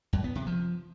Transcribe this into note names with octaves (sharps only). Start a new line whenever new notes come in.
F#2
B3
C3
F3